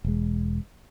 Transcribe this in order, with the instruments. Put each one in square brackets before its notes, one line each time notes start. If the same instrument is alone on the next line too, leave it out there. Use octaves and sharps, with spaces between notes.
[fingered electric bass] E1 G#3